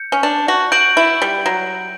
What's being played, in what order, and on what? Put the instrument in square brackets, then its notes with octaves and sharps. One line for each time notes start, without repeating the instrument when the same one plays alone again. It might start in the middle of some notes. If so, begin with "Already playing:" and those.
Already playing: [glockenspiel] G6 C#7
[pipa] C#4
D4
F#4
[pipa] F#4 [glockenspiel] G6 D7 F#7
[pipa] E4
G3
F#3